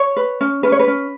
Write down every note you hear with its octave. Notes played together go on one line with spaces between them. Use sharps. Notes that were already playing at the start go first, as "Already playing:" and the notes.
Already playing: C#5
B4
C#4
C#4 B4
C#5
B4
C#4